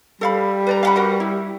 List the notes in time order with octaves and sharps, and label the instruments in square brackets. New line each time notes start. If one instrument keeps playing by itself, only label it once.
[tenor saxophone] G3 [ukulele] A4 F5 B5
[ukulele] B4 D5 A#5
F5 F#5 B5
F#4 A#4 F#5
E4